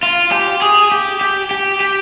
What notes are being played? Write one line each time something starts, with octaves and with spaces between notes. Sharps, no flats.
F4
G4
G#4
G4
G4
G4
G4